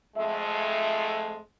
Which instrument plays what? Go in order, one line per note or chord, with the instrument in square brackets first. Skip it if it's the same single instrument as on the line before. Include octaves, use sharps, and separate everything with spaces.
[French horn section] F2 G#3 A3 [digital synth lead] E5